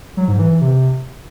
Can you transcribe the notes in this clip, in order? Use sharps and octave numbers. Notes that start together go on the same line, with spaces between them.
F#3
G#2
E3
E3
C3